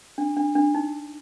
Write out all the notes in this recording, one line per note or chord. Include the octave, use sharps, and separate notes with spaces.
D4
D4
D4
D#4